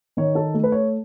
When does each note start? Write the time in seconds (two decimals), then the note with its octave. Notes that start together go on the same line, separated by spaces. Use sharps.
0.17 D#3 C#5
0.35 A4
0.54 A3
0.63 B4
0.72 C#5